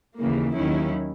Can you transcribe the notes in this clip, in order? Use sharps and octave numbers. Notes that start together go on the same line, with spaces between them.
D#2 C#3 E3 A#3
D#2 D#3 F#3 C#4 E4